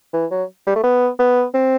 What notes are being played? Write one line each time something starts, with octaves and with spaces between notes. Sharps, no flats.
E3
F#3
G3
A3
B3
B3
C4